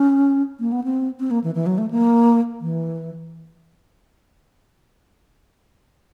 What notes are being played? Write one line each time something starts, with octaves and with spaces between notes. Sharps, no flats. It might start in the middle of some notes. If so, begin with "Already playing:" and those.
Already playing: C#4
A#3
B3
C4
C4
A#3
E3
E3
F#3
A3
A#3
E3